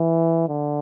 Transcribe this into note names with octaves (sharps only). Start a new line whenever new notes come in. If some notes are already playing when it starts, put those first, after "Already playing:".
Already playing: E3
D3